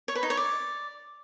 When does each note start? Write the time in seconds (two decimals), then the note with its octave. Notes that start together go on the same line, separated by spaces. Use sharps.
0.08 C#5
0.15 B4
0.23 D#4
0.30 C#5
0.37 D5